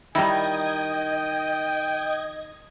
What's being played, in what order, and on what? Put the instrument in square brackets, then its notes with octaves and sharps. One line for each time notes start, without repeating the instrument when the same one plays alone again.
[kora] D#3 D#4 [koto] G3 E4 [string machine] D#5 D#6 G#6 [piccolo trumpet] G5